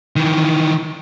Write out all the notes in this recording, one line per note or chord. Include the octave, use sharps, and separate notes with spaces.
D#3 E3